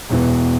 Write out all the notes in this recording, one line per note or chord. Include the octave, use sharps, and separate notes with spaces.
E1 E2 E3 B3